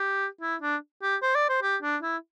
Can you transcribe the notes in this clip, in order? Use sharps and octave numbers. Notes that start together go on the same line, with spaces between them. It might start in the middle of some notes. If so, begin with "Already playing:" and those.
Already playing: G4
E4
D4
G4
C5
D5
C5
G4
D4
E4